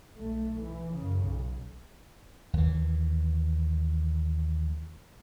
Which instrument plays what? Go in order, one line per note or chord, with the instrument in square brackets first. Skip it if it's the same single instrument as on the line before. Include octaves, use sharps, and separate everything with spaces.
[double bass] B1 A3
E3
F#2 C#3
B1
[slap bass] D#2 E3